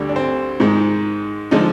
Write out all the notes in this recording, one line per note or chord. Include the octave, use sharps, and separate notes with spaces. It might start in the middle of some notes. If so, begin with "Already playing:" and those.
Already playing: D2 D3 G3
D4
C4
G#2 D#3 G#3
D3 F3 G#3 D#4